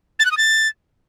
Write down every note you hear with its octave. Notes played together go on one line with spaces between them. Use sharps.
A6
F#6
D#6
A6